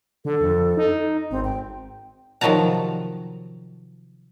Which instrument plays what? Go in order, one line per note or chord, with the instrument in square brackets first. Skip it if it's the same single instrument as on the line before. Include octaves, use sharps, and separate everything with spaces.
[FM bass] D3 [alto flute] A4
[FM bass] F2
D#4
[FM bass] G#1 [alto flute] C4
[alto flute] G5
[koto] C3 D#3 F3 F#3 A5 A#5